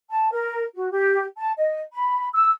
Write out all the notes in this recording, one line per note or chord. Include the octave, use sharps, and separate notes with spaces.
A5
A#4
F#4
G4
A5
D#5
B5
E6